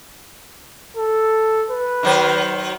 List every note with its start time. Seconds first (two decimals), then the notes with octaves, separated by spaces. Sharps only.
0.97 A4
1.70 B4
2.03 D#3 F#3 C5